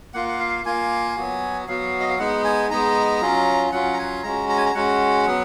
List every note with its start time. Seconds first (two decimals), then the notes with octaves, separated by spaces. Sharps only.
0.14 A#3 F4 F#5
0.28 F#5
0.40 F5
0.65 A#3 F4 G#5
1.16 F#3 B3 F#4
1.68 F#3 B3 F#4 F5
2.00 D#5
2.09 F5
2.19 G#3 B3 D#4 F#5
2.44 G#5
2.70 G#3 B3 D#4 A#5
3.21 F#3 C#4 F4
3.72 F#3 C#4 F4 F#5
3.93 A#5
3.98 G#5
4.23 G#3 C#4 F#4 A#5
4.49 A#5
4.57 G#5
4.66 A#5
4.75 G#3 C#4 F#4 F#5
5.26 F#3 B3